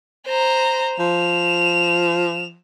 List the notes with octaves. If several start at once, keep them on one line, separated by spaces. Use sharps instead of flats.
C5 A#5
F3 E7 F7